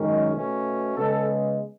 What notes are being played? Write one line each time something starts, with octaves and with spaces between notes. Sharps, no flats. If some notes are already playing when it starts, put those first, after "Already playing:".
Already playing: F#2 D#3 G#3 C#4
B2 A3 C#4
C#3 G#3 B3 A4